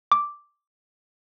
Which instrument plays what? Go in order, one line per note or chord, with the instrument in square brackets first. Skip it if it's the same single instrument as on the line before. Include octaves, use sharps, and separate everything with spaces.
[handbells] D6